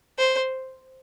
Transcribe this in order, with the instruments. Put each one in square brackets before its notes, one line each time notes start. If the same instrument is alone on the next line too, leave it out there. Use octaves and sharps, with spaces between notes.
[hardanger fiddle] C5